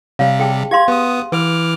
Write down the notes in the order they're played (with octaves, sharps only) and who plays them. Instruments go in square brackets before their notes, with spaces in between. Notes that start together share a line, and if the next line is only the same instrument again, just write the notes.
[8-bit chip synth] C3 G3 [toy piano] C#5 F5
[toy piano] G#4 G5 A5
[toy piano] G4 F5 C6 [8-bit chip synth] G#6
[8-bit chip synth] B3 D#6
[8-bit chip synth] E3 D6 F6 [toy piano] B4